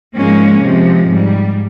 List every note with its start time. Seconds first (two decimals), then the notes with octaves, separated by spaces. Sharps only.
0.15 G#2 F3 G#3 A#3 C#4
0.62 C3 F3 G#3
1.08 G#2 G3